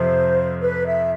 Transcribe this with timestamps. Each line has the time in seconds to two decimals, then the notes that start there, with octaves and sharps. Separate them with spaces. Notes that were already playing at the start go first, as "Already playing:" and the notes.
Already playing: F2 C3 F3 C5
0.61 B4
0.86 E5